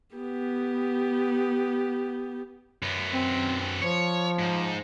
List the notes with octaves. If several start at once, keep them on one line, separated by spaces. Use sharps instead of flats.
B3 G4
F#2 B3
C4
F3 C#5
G#2